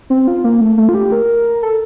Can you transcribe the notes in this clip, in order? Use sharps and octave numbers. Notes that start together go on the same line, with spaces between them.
C4
F4
A#3
A3
A3
F4
G4
A#4
A4